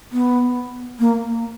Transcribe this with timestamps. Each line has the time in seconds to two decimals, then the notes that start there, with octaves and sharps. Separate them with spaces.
0.12 B3
0.99 A#3